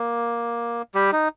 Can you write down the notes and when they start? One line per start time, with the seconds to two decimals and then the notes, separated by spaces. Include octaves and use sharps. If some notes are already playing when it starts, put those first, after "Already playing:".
Already playing: A#3
0.95 G3 G4
1.12 D#4